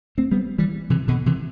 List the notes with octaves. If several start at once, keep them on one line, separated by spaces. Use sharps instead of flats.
A3 C4
G3 B3
E3 G3
C3 E3
B2 D3
C3 E3